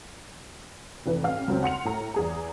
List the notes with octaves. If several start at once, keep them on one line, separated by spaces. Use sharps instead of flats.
F1 E3 B4
A1 F5 F6
C#2 F#3 C4
F#5 C6 C#7 F7
A2 A#5 C#7
E2 G#4 A#5